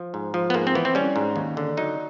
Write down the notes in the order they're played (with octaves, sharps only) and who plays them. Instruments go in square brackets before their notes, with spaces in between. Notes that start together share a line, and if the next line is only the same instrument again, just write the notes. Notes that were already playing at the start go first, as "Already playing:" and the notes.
Already playing: [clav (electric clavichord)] F3
G#2
F3
B3
G#2 A#3
C4
E3 B3
C4
G3 C#4
G#2
D#2
D3
F#3 D#4